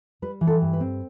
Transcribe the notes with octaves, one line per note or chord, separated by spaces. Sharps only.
G3 B4
E3
A4
G2
B4
C4